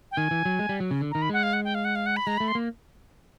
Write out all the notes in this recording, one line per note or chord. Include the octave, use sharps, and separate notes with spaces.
G5
D#3 G#5
E3
F#3
G#3
G3
F#3
C#3
D3
A#5
D#3
B5
G#3 F#5
F5
F#5
G5
F5
F#5
F5
F#5
B5
G#3 A#5
B5
A3
C6
A#3